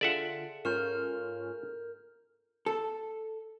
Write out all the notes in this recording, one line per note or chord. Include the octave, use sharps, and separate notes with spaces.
D3 F4 G#4 A4 D5 E5 F#5
G#2 C#4 F4 A#4 F6 G6
A4